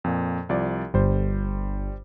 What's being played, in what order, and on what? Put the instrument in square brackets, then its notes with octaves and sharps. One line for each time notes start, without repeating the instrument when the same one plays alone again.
[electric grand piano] F2 A#2
C2 F3 D5
[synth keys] G1 [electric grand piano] G3 C5